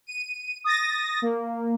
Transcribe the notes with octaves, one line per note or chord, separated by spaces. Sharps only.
D#7
D#6 A6 A#6
A#3